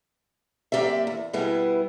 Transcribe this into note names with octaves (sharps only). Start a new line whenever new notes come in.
F#2 A#3 G4 D5 E5
E2
B2 G3 B3 E4 G#4